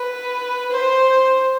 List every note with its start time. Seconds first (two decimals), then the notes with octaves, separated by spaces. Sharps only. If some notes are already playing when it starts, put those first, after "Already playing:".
Already playing: B4
0.71 C5